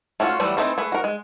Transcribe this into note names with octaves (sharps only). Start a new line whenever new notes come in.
A3 C#4 D4 F4 F#4
E3 F#3 G3 A3
E3 A3 C4 D#4 E4
A3 G#4 B4
F#4 A#4
G#3